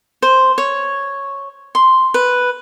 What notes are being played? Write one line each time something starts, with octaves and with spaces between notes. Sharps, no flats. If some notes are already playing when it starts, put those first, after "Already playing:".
C5
C#5
C6
B4